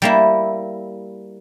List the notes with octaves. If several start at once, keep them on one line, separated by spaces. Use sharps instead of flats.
G3 A#3 E4